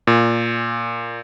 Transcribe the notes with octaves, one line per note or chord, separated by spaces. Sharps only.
A#2